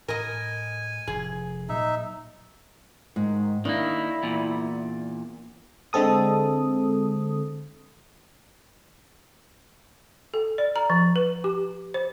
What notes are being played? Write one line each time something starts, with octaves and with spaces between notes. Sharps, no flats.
A2 A#4 D#5 G#5
F1 G#4
A#2 F#3 D#4 E5
G#2 D#3
D#3 A#3 D4 E4
E2 A#2
D3 G#3 C4 A4 D#6
A4
D5
A#5
F3
B4
G4
C5